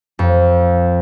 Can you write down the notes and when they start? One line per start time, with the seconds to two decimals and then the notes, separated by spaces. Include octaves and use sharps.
0.19 F2